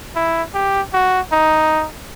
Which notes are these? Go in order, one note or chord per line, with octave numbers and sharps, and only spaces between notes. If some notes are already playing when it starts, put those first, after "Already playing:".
E4
G4
F#4
D#4